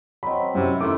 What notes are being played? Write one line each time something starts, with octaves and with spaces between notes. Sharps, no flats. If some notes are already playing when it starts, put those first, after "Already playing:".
F#3 C4 D#5 B5
F#2 C3 E4 C#5
D#3 A3 E4 C6 D6